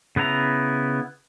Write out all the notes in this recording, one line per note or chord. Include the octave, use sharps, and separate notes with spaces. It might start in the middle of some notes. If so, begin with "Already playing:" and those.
C#3 B3 E4 A#5